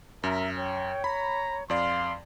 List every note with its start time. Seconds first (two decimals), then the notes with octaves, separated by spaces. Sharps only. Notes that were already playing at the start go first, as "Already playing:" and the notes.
0.24 F#2 A#4 E5
0.57 C#5 G5
1.04 A#5 B5
1.70 F2 D5 F5 C6